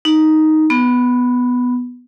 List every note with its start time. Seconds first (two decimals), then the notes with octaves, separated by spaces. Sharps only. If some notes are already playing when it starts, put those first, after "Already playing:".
0.05 D#4
0.70 B3